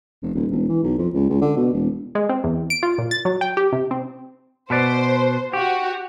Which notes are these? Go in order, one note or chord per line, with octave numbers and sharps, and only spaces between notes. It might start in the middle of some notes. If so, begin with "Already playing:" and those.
F1
D#1
E1
E3
B1
F2
C#2
C#2
D3
B2
E1
G#3
C4
E2
D7
F4
A#2
A6
F#3
G5
G4
C3
C4
B2 B4 C5 D5
F#4 G4